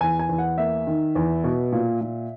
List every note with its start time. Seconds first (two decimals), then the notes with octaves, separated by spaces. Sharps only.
0.01 E2 G#5
0.19 G#5
0.29 E2
0.38 F#5
0.58 A#3 E5
0.87 D#3
1.15 E2
1.44 B2
1.73 A#2
2.01 A#2